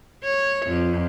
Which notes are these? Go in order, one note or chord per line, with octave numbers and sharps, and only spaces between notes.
C#5
F2